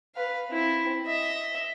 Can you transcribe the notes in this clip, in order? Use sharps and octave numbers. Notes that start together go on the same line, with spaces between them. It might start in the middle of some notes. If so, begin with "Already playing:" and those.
B4 F5
C4 E4
D#5 E5